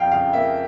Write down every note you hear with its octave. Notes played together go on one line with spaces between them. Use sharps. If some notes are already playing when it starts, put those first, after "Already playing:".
Already playing: F2 F3 F5 G5
C#3 F5
A#3 E5